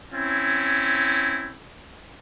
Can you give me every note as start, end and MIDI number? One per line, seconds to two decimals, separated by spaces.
0.14 1.55 60
0.14 1.55 61
0.14 1.55 64